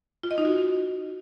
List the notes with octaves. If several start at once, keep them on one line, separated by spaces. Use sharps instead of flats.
F4
D#5
D#4
F#4